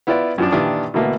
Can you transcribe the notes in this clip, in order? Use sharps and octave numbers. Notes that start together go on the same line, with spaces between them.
B3 E4 F4 B4 D5
F#2 F3 D4
A#2 D#3 E3 D4 F4 G4
B2 D3 E3 A3 A#3